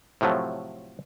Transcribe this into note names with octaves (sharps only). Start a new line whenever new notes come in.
A2 C3 F3 F#3 A3